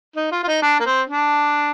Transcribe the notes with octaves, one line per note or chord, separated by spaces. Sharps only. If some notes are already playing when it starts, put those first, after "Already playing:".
D#4
F4
F4
D#4
D4
A#3
C4
D4